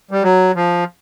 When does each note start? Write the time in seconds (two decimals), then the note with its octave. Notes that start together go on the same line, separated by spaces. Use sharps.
0.11 G3
0.23 F#3
0.55 F3